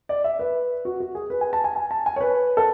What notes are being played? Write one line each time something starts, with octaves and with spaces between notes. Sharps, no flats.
D5
E5
B4
F#4
F#4
G#4
B4
G#5
A5
G#5
G#5
A5
G#5
C#5
B4
A4